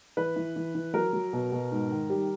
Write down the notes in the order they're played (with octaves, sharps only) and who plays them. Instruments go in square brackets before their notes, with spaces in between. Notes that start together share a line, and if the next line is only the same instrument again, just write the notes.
[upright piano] E3 B4
E3
E3
E3
F#3 A#4
F#3
B2
B2
G#2
D#3
G3